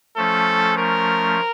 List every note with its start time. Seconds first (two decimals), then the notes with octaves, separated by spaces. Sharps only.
0.16 F3 A3 C#4 A4
0.78 A#4